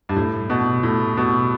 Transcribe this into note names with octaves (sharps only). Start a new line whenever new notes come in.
G2
A2
B2
A2
B2